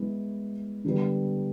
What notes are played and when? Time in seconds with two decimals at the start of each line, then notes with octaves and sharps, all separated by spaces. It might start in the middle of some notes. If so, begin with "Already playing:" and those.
Already playing: G#3 B3 E4
0.84 D3 G3 B3